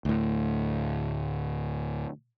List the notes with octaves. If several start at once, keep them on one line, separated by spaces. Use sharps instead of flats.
D2 A2